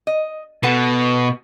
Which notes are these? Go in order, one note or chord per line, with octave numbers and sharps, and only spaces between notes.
D#5
B2 A4 B4 F#5